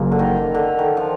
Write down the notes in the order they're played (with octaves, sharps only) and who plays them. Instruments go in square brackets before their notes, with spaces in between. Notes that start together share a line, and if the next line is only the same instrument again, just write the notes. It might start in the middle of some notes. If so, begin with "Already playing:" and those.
Already playing: [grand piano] F#1 F#2 C#3 F3 A#3
[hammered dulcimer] D3
D#3
D3
D#3
F3